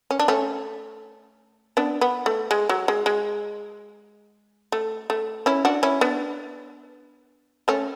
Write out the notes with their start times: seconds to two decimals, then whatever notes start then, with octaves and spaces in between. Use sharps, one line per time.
0.11 C#4
0.19 D4
0.28 A3 C#4
1.77 B3 D4
2.01 B3
2.26 A3
2.51 G#3
2.69 F#3
2.88 G#3
3.06 G#3
4.72 A3
5.10 A3
5.46 C#4 E4
5.65 D4 F#4
5.83 C#4 E4
6.01 B3 D4
7.68 A3 C#4